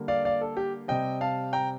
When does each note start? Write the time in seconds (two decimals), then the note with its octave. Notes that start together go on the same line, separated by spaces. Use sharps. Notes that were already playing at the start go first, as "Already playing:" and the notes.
Already playing: D3 G3 A#3
0.08 D5 F5
0.25 D5 F5
0.41 A4
0.57 G4
0.88 C3 G3 C4 D#5 G5
1.21 F5 A5
1.53 G5 A#5